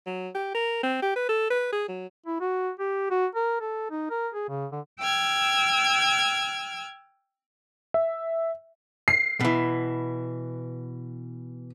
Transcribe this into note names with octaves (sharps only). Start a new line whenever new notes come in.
F#3
G4
A#4
C4
G4
B4
A4
B4
G#4
F#3
E4
F#4
G4
F#4
A#4
A4
D#4
A#4
G#4
C#3
D3
G5 E6 F6 G#6
E5
C7
B2 E3